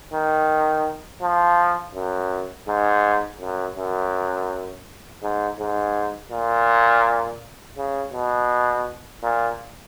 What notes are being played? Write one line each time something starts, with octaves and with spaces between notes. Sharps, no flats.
D#3
F3
F#2
G#2
F#2
F#2
G#2
G#2
A#2
C#3
B2
A#2